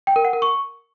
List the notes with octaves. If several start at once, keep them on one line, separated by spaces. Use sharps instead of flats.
G5
A#4
F#5
A#4
C#6